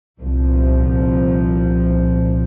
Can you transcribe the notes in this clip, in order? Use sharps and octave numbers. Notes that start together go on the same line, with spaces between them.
C2 A#2 F3